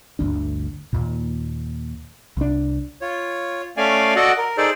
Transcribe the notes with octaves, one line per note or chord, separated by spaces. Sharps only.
G1 D2 D4
D#2 A#2
C2 D4
F4 C#5
A3 C#4 D5 F5 G#5
F#4 A4 D5 D#5 F#5
A#4
D#4 G#4 A4 C5 D5